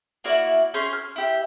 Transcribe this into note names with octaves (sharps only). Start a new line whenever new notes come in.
A#3 E4 F#4 D5
C#4 G#4 C6 G6
F6
E4 G4